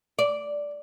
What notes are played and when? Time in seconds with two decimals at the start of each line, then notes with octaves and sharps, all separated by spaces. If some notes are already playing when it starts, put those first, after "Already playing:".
0.19 D5